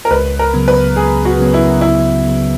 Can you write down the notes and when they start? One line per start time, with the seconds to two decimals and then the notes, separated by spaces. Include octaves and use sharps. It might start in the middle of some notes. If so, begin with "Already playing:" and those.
0.05 A#4
0.11 C#2 B4
0.39 A#4
0.54 C#3 F#3 B3
0.68 B4
0.96 C#2 G#4
1.25 F#4
1.39 C#3 F#3 B3
1.54 E4
1.81 C#2 E4
2.24 C#3 F#3 B3